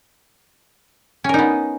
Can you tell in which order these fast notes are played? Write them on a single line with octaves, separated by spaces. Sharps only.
C#4 A#4 D#4 B3